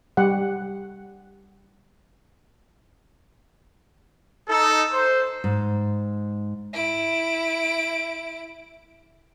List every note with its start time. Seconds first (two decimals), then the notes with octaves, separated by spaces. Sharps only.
0.17 G3 G4 F#5
4.48 D#4 A4
4.91 C5
5.44 G#2
6.73 E4 D7